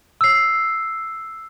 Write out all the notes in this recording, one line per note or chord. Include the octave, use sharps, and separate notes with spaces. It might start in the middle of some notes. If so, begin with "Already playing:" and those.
E6 C7